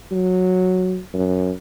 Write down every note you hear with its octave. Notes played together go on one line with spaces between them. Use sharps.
F#3
F#2